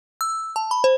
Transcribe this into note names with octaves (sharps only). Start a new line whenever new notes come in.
E6
A5
B5
C5